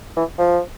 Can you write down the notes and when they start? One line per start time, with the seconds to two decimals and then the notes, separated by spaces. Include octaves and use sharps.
0.17 E3
0.39 F3